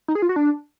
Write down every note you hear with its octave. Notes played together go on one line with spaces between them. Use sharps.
D#4
G#4
F4
F#4
D4